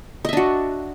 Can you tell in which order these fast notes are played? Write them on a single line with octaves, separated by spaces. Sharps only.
D#5 E5 D4 F#4